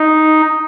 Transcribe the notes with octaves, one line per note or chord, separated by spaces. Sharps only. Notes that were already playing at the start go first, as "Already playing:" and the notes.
Already playing: D#4